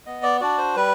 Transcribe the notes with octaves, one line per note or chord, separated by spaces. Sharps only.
B3 D#5
D5
D4 F#4 D5
C5
G3 B4